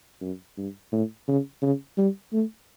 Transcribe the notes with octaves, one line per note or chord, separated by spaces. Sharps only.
F#2
G2
A2
C#3
C#3
G3
A3